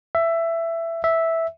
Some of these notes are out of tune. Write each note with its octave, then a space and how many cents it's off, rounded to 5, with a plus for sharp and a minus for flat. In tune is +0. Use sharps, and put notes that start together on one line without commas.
E5 +15
E5 -5